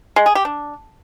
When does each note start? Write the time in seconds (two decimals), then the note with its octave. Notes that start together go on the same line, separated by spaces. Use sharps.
0.16 G#3
0.26 G#4
0.35 G4
0.45 D4